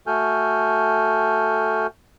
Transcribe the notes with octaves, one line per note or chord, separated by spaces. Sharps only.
A3 F#4 A4 G#5 F6 G6